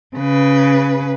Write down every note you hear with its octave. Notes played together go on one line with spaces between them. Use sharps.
C#3 B4